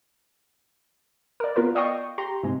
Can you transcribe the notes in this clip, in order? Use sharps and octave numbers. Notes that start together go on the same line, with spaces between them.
A#4 D5
B3 F4 A#4 B4
D5 D#5 F5 G5 C#6 D#6
G4 A#5 C6
G#2 C3 G#3